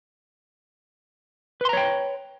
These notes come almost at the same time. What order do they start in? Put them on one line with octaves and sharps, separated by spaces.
B4 C6 A#5 C#5 G5